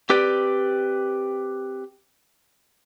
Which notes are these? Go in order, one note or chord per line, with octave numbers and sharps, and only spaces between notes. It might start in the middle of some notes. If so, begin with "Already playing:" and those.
C4 G4 B4 D5 G5